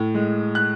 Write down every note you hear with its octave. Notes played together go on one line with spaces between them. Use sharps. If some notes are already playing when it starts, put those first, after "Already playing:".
Already playing: A2
G#3
F#6